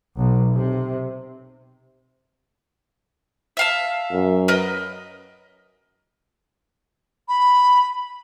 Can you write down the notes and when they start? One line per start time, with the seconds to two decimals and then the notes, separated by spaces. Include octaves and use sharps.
0.19 B1
0.55 C3
3.57 E5 F5 A5
4.11 F#2
4.48 A#4 B4 D#5
7.29 B5